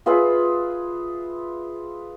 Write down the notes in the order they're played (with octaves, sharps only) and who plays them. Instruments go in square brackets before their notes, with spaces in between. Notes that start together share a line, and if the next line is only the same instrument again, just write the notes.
[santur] F4 G#4 B4 E5